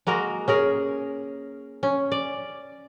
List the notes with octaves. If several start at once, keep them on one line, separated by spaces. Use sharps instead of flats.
G#3 A#3 F#4 A#4
C#4 G#4 A#4
C#4
D5